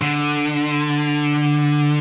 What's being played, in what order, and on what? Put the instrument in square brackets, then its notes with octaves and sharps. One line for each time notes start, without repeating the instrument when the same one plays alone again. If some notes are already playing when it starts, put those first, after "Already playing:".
[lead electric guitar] D3